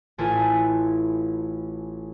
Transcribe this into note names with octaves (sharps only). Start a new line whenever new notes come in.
A1 E4 F4 A4 G#5 B6